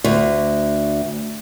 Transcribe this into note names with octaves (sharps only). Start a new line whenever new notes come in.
D2